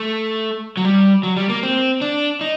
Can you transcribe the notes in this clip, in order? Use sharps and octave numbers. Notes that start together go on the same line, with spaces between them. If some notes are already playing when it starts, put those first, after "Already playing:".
Already playing: A3
F#3
G3
F#3
G3
A#3
C4
D4
D#4